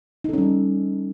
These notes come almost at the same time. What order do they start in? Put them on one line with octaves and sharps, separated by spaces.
D#4 A4 C#4 G3